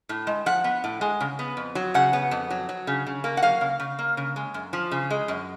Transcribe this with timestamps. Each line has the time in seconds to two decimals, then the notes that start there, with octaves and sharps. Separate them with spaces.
0.09 A2
0.27 G#3
0.46 F3 F#5
0.64 B3
0.84 A2
1.01 G#3
1.21 C#3
1.39 B3
1.57 F2
1.75 F#3
1.94 C#3 F#5
2.13 B3
2.31 F2
2.50 F#3
2.69 F#3
2.87 C#3
3.07 C#3
3.24 A#3
3.37 F#5
3.43 F#3 F5
3.61 C#3
3.80 C#3
3.99 A#3
4.17 C#3
4.36 G#3
4.54 F#2
4.73 F3
4.92 C#3
5.10 G#3
5.28 F#2